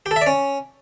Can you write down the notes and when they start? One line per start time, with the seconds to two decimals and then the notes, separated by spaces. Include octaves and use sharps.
0.06 G4
0.11 A4
0.16 E5
0.21 D5
0.26 C#4